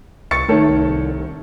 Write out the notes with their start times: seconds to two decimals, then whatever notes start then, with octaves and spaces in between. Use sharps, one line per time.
0.31 C2 C#6 A6 C#7
0.49 D#3 A3 A4 C#5
0.69 C2